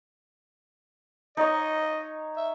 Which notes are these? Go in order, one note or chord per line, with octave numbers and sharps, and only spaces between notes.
D#4 C#5 D#5
E5